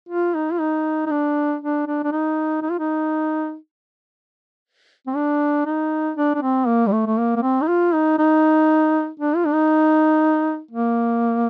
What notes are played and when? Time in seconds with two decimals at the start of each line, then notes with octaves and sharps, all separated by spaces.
0.09 F4
0.35 D#4
0.52 F4
0.60 D#4
1.06 D#4
1.11 D4
1.61 D4
1.87 D4
2.04 D4
2.12 D#4
2.62 D#4
2.71 F4
2.79 D#4
5.07 C4
5.16 D4
5.66 D#4
6.17 D4
6.35 D4
6.42 C4
6.67 A#3
6.87 G3
6.92 A3
7.06 A3
7.18 A#3
7.36 A#3
7.42 C4
7.62 D#4
7.68 F4
7.94 D#4
8.18 D#4
9.20 D4
9.36 F4
9.46 D4
9.54 D#4
10.71 A#3